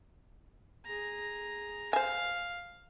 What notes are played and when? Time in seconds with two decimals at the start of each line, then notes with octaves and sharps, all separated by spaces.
0.86 G#4 A#5
1.93 C5 F5 G#5